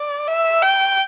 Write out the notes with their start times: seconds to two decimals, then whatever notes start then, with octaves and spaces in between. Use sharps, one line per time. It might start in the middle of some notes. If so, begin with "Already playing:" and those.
Already playing: D5
0.28 E5
0.62 G5